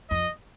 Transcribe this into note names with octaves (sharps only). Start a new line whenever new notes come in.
F2 D#5